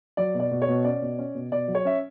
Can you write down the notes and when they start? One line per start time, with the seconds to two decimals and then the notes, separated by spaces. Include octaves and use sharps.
0.17 F#3 D5
0.34 B2
0.40 D5
0.51 B2
0.62 C#5
0.68 B2
0.84 C#4 D5
1.02 B2
1.19 C#4
1.35 B2
1.51 B2 D5
1.68 F#3
1.75 C#5
1.85 C#4 E5